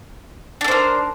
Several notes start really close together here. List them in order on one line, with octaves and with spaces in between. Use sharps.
D4 A4 C5 A#4